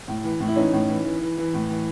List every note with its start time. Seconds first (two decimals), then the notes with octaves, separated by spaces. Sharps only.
0.08 A2
0.24 E3
0.40 A2
0.48 E4
0.56 E3 C#4 D#4
0.73 A2
0.89 E3
1.05 E3
1.21 E3
1.37 E3
1.54 A2
1.70 E3